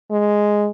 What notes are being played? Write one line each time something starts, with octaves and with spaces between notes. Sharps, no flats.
G#3